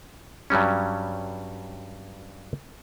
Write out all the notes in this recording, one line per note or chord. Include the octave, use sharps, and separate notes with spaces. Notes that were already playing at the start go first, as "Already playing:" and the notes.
G2 F#3 G3 C#4